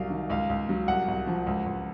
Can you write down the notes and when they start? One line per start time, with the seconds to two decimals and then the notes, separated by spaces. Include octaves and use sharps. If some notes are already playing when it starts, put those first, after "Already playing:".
Already playing: C2 F#3 F5
0.10 D#3
0.30 C#2 F5
0.49 C#2
0.69 F#3
0.88 C2 F#5
1.08 C2
1.27 F3
1.47 C#2
1.66 C#2